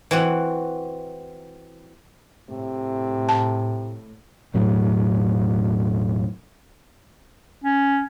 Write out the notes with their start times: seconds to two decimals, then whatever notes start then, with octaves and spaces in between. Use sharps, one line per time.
0.11 E3 C4 F#4
2.50 A2 C3
3.29 A5
4.54 E1 A2 F#3
7.64 C#4